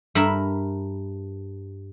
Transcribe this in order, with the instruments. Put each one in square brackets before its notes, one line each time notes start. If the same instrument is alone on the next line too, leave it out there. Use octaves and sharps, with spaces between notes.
[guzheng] G2 A#4 E5 B5